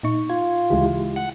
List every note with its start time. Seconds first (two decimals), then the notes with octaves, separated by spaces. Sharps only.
0.03 A#2 D#4 C#6
0.29 F4 G#6
0.70 D2 C#3 E3 G#3 E4 G4
1.16 F#5